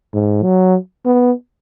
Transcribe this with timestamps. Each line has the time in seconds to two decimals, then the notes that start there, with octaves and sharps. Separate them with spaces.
0.14 G#2
0.43 F#3
1.06 B3